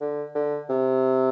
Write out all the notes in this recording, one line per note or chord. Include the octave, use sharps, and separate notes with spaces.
D3
D3
C3